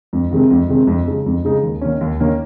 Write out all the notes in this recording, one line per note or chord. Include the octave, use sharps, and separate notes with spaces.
F2
C3 D#3 G#3 C4
F2
C3 D#3 G#3 C4
F2
C#3 G#3 D#4
F2
C#3 G#3 D#4
D#2
D#3 A#3 C#4
D#2
D#3 A#3 C#4